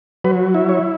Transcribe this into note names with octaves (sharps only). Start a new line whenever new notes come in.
F#3 B4
E4
C#5